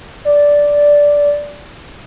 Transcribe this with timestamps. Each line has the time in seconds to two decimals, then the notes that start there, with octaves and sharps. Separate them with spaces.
0.25 D5